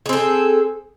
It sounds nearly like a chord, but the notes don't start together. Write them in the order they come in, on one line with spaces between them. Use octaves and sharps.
G#4 C4 A4